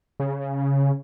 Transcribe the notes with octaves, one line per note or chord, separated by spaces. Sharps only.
C#3